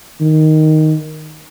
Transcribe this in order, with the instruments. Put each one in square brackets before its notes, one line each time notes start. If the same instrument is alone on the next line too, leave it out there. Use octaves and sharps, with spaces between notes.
[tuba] D#3